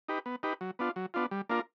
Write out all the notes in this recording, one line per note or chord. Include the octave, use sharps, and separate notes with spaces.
D#4 G4 B4
B3
D#4 G4 B4
F#3
B3 D4 F4
F#3
B3 D4 F4
G3
A#3 D4 F4 A#4